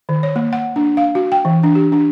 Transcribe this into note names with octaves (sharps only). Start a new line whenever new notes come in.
D#3
C#5
A#3
F#5
D4
F5
F#4
G5
E3
D4
G4
D4